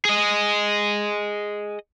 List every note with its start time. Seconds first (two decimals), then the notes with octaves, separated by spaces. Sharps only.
0.05 G#4 D#5